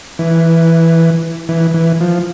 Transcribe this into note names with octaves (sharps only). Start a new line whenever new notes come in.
E3
E3
E3
F3